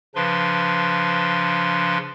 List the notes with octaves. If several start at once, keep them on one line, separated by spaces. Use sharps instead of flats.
C#3 F3 D4 B4 C6